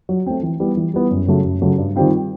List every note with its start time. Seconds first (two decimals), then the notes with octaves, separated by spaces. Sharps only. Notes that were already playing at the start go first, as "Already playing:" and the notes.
0.09 F#3
0.26 A3 C4
0.43 E3
0.60 G3 B3 E4
0.77 E3
0.94 G3 B3 E4
1.11 F#2
1.27 C#3 F#3 A3
1.44 F#2
1.62 C#3 F#3 A3
1.78 G2
1.96 D#3 G3 C4 F4